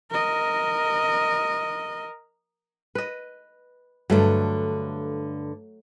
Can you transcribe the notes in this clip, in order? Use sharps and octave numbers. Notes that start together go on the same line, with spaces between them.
A#4 D#5
B4 D#5
G2 D3 F#3 A3